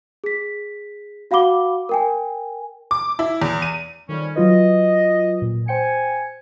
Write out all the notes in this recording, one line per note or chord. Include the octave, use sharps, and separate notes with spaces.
G#4 B6
F#4 F5 F#5 B5 D6 G7
A#4 G5 G#5
D6
E4
E2
D#7
F2 D#3 G3 C#4
F#3 F4 B4 D#5
A#2
C5 G5 G#5 C#7